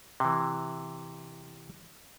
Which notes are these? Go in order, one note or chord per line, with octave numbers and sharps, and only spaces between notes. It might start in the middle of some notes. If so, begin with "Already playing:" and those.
C3 E3